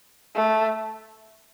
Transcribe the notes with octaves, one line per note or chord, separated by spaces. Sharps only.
A3